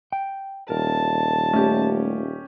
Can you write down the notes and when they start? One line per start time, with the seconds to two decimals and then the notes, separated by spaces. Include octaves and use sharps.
0.12 G5
0.70 D#1 A#4 A5
1.53 A3 C#4 G4